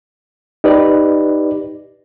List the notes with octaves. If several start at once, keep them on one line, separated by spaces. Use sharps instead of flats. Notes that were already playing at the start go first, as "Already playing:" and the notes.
D#4 G4 B4 D5